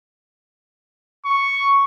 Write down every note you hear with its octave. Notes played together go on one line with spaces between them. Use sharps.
C#6